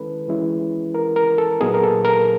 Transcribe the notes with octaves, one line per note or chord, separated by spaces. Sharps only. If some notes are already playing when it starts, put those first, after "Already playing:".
Already playing: D#3 G#3 C#4 E4 A4 B4
E3 G#3 C#4 E4
A#4
A#4
A4
A#2 F#3 B3 D#4 G#4
A#4
A4
A#4